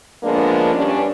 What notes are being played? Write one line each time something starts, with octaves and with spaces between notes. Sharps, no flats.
D3 F3 G#3 A#3 B3 D4
G2 C#4 D4